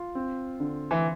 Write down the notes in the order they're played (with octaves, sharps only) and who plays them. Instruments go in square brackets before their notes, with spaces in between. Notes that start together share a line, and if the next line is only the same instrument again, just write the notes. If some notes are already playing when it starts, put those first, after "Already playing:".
Already playing: [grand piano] F4
C4
D3
[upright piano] E3